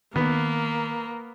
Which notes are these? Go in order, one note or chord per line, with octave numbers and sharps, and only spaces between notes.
D#3 A#3 B3